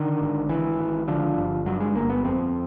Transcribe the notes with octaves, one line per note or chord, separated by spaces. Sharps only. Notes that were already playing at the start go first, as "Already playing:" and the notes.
Already playing: D3 D#3
G#1
G#1 E3
G#1
D3 F3
G1
G2 F#3
G#3
G1 A#3
B3
F2 C4